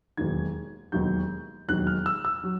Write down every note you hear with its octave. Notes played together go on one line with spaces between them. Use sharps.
E1 D#2 D#3 F#3 G#6
E1 D#2 D#3 F#3 G6
E1 D#2 D#3 F#3 F#6
F6
E6
E6
F#3